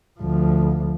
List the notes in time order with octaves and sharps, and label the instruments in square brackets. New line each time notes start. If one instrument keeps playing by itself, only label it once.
[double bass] D2 F3